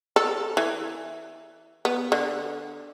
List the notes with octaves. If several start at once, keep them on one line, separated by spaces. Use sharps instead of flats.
A4
E3
B3
D3